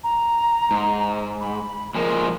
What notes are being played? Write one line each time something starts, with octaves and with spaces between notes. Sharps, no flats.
A#5
G#2
B5
A#2 F3 G#3 A#4